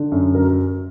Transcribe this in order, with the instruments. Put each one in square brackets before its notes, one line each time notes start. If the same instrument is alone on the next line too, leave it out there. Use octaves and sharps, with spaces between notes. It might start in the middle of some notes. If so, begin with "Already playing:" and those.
Already playing: [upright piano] D3
F#2
F#3 A#4